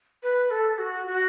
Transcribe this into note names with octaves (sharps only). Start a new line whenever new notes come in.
B4
A4
F#4
F#4